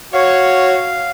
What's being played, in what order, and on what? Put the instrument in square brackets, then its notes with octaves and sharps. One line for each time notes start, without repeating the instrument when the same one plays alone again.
[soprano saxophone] F#4 [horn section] C#5 [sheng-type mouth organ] F5